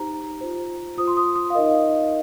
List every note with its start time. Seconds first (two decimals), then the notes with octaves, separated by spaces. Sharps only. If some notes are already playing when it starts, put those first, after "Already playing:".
Already playing: D#4 G4 C5 A#5
0.41 F4 C5
0.97 F4 C5 D#6
1.07 C6
1.17 D#6
1.36 D#6
1.50 F5
1.55 D#4 A#4 D#5
1.69 F5